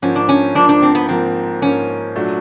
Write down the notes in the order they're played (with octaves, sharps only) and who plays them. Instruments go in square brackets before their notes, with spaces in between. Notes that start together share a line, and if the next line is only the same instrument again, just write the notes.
[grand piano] G#2 F3 A#3 [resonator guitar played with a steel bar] C#4
[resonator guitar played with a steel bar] D4
C#4
[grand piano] G#2 F3 A#3 [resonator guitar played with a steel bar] D4
[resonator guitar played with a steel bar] D4
C4
B3
[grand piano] G#2 F3 A#3 [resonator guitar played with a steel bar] C4
[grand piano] G#2 F3 A#3 [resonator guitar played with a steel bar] C#4
[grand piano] A#2 F#3 A3 D4